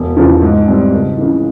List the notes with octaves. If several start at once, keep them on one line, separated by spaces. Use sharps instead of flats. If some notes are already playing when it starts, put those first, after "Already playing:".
Already playing: E1
E2 C#3 F3
G#2
G3 C4
C#2
C#3 E3